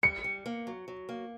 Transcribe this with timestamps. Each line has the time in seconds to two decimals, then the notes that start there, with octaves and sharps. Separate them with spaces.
0.03 G3 C#7
0.24 G3
0.46 A#3
0.67 F#3
0.88 F#3
1.09 A#3